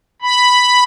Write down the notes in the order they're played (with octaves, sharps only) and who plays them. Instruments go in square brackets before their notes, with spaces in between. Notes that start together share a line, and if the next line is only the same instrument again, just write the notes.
[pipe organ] B5